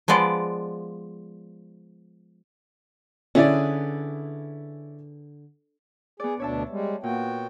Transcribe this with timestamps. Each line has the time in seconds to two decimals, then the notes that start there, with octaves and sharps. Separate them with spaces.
0.08 F3 G#3 B3 D5 D#5
3.35 D3 C#4 E4 G#4 B4 D5
6.20 B3 G#4 D5
6.39 D2 B2 D4 C#5 E5 A5
6.69 G3 G#3
7.03 A#2 B3 F#4 G5